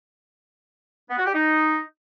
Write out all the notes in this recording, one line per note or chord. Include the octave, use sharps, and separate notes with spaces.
B3
F#4
G4
D#4